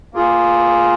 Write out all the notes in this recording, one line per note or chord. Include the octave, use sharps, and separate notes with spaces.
A#3 F4 G#4